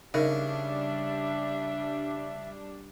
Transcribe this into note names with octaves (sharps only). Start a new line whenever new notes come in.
C#3 G3 D4 D#4 A#4 D#5 E5